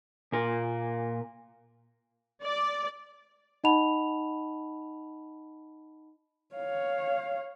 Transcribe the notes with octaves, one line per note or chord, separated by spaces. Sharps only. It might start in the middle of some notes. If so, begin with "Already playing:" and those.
A#2 A#4
D5
D#4 D#5 F#5 A5 B5 F7
C#5 F5